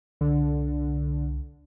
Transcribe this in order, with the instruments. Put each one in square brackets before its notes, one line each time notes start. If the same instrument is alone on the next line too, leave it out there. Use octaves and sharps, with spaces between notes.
[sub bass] C2 [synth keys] D3